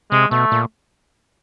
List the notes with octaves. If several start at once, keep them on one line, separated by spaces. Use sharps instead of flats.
C3 G#3
B2 A3
A#2